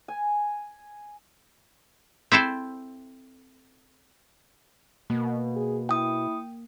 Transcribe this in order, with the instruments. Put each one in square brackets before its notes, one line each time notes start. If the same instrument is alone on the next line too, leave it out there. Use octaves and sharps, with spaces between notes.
[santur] G#5
[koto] C4 E4 A4 C5
[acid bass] B2 [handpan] A#3
[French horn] G#4
[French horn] E4 [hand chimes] G5 D#6